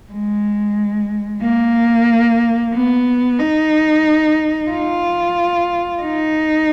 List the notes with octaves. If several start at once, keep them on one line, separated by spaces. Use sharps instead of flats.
G#3
A#3
B3
D#4
F4
D#4